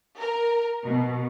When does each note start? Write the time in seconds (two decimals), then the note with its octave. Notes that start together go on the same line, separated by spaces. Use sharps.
0.20 A#4
0.87 B2